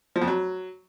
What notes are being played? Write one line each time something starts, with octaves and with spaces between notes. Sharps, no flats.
F3
F2
F#3